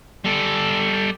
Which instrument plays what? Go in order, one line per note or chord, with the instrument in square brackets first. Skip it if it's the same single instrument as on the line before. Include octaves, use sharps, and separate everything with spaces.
[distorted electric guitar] G3 A4